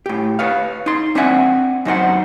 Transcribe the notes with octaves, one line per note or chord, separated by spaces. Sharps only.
A2 G4
B4 C#5 F5
D#4 C6
C4 D4 C5 E5 F#5 G#5
F#2 D#4 C5 F#5